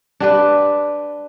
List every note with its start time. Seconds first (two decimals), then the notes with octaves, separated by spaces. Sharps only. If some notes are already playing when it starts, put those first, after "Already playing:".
0.20 D4 G4 B4